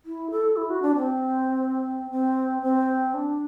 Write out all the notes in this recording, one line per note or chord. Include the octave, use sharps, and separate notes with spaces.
E4
A4
E4
F#4
D4
C4
C4
C4
D4